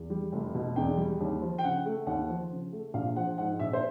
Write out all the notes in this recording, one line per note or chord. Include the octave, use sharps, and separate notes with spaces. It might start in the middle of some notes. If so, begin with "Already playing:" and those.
Already playing: E2
G3
F1
B2
E2 G5
G3
D#2
F3
G5
C#3 F#5
A3
D#2 F#5
F3
C#3
A3
A#1 F5
F3 F#5
G#2 F#5
A#1 E5
C5